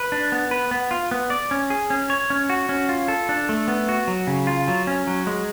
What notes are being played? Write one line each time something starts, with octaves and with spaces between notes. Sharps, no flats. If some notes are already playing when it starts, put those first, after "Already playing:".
Already playing: B4
D4
B3
B4
B3
F4
B3
D5
C#4
G#4
C#4
C#5
C#4
F#4
C#4
F4
A4
D4
A3
B3
F#4
F#3
C#3
F4
F#3
C#4
F#3
G#3